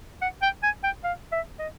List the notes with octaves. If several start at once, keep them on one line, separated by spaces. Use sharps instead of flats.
F#5
G5
G#5
G5
F5
E5
D#5